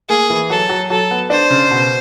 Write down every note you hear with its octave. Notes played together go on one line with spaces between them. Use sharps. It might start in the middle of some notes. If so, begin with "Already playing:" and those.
A#3 G#4
E3
F#3 A4
F#3
F#3 A4
B3
D4 C5
C#3
B2